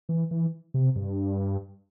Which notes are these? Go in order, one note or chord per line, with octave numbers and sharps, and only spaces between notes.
E3
E3
C3
G2